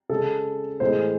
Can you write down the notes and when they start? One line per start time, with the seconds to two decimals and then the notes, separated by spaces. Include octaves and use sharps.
0.09 C#3 G#3 A4
0.80 A2 E3 G#3 C5